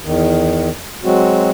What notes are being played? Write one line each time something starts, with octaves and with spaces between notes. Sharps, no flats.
E2 D#3
F#3 G#3 C4 F#4